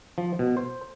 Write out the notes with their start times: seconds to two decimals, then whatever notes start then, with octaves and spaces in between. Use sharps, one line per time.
0.18 F3
0.39 B2
0.57 C5